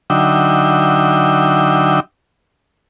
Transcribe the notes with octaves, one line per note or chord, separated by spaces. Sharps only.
D3 F#3 D#4 E5 G5